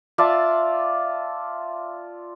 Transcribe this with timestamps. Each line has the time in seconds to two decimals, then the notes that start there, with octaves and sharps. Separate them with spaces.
0.18 F4 D5 E5 A5